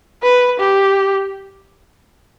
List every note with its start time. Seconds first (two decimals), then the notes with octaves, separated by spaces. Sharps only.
0.23 B4
0.60 G4